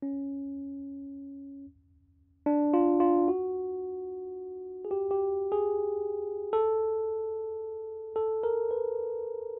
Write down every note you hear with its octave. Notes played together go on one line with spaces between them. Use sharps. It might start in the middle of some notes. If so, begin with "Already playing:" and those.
C#4
D4
F4
F4
F#4
G#4
G4
G4
G#4
A4
A4
A#4
B4